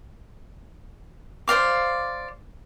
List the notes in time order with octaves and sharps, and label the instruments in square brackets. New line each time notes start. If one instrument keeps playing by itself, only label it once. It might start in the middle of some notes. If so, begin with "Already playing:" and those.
[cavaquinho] C5 D5 F5 D6